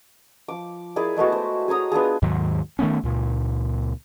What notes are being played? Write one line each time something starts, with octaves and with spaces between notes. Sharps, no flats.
F3 D6
E4 G#4 A#4 D5
G#3 A3 B3 F#4
C5
G#4 C#5 A#5 D#6
B3 D4 F4 G#4
D#2 G#2 D#3 F#3
D#3 A3 B3 C#4
C#2 A#2